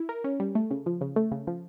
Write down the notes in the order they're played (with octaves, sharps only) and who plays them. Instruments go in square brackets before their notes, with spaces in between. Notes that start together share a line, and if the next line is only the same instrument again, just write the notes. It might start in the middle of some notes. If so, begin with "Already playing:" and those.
Already playing: [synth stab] E4
A#4
C#4
G3
A3
C#3
F3
C#3
A3
C#3
F3